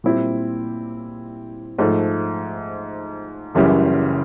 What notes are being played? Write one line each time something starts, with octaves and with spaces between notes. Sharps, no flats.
A#2 G3 C4 E4
G#2 F3 A3
F#1 F#2 C#3 E3 G3